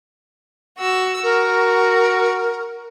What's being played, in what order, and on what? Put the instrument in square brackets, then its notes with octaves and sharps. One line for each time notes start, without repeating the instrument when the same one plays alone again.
[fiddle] F#4 E6
[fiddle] F#4 [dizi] A#4